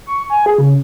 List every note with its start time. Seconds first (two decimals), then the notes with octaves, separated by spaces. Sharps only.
0.07 C#6
0.30 G#5
0.46 G#4
0.58 C#3